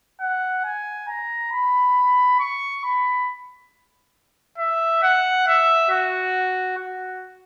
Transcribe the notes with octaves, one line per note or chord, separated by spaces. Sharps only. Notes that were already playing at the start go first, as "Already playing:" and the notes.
F#5
G#5
A#5
B5
C#6
B5
E5
F#5
E5
F#4
F#4